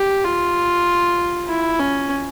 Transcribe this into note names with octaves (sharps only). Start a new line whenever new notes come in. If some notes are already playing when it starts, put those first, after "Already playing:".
Already playing: G4
F4
E4
C#4